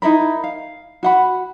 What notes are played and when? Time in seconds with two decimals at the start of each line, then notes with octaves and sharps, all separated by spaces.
0.02 D#4 E4 A#4 B5
0.44 F5
1.03 F#4 F#5 B5